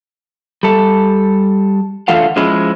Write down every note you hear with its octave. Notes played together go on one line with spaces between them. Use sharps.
G3 A4
D3 E3 A3 F4 F5 F#5
F3 G#3 C#4 E4